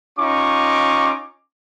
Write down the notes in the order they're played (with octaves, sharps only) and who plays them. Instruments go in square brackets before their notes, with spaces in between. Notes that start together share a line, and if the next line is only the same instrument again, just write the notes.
[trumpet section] C#4 D#4 F4 C#6 D6